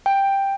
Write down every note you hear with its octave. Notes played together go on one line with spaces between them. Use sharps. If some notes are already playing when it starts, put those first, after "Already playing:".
G5